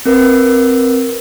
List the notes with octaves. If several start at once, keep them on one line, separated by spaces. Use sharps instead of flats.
C4 A#4 B4